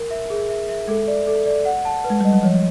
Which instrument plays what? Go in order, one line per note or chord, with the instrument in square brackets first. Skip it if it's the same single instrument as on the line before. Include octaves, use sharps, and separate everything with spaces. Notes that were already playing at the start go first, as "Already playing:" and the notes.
Already playing: [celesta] A#4
E5
G#4
E5
E5
[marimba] G#3 [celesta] A4
[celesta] D5
A4
D5
F#5
A5
B4
[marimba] G#3
[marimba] G3 [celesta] D#5
[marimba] F#3
[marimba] F3 [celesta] C#5